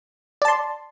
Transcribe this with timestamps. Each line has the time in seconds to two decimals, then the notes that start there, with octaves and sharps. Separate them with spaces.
0.42 D5
0.45 A5
0.48 C6